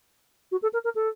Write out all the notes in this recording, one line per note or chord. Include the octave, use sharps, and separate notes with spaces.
F#4
A4
A#4
A#4
A4